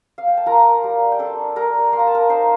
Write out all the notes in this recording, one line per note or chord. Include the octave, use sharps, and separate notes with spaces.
F5
G5
A5
F4 A#4 A#5
G3
G5
D4 A4 A5
G3 A#4 A#5
A#3 C6
A#5
A5
A#4 A#5
D#4 C5 C6